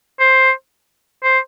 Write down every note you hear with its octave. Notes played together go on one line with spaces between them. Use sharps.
C5
C5